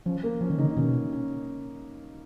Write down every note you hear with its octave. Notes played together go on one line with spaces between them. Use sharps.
F3 C#4
A#3
F3 C#4
D#3
C#3 D#4
D#3
D#4
B2 C#4
C#4